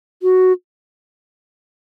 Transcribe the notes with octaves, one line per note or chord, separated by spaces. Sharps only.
F#4